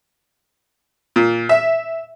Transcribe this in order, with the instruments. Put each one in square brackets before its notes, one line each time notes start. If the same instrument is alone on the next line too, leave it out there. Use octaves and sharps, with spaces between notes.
[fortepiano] A#2
E5